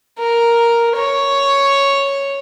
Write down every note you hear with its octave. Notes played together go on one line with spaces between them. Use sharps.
A#4
C#5